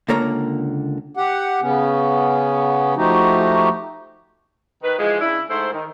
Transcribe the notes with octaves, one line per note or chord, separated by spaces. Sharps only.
C#2 D3 A#3 A#4 C#5 A#5
G4 F#5
C#3 B3 C#4
F3 A3 D#4 F#4 G4
D#3 B4
E3 F3 G#3
C#3 D4 E4
G#2 A3 E4 C5
D#3